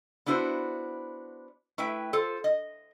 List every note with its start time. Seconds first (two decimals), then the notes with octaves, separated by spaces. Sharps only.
0.26 B3 D4 E4 F#4 C5
1.78 A3 E4 B4 E5 G5
2.13 F4 A4 C5
2.44 D#5